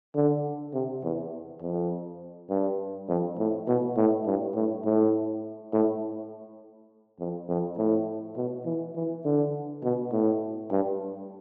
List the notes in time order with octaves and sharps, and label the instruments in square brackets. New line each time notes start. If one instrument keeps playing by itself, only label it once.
[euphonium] D3
C3
E2
F2
G2
F2
A2
B2
A2
G2
A2
A2
A2
F2
F2
A2
B2
E3
E3
D3
B2
A2
G2